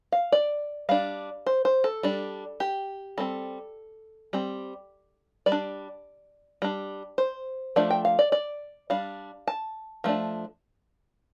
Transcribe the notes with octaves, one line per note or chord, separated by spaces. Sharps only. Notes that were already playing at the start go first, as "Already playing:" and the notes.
F5
D5
G3 D4 F5
C5
C5
A4
G3 D4
G4
G3 C4 A4
G3 C4
G3 D5
D4
G3 D4
C5
F3 A3 D4 D5
G5
F5
D5
D5
G3 D4 F5
A5
F3 A3 D4